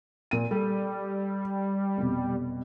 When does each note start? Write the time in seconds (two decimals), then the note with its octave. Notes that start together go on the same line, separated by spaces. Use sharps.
0.31 A#2 D#7
0.51 G3 A4
1.97 F1 B2